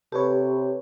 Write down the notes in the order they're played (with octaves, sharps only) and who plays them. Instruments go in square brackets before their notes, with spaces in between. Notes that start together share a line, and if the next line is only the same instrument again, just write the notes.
[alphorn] C3 [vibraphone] G4 [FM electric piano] A4 B4 C#5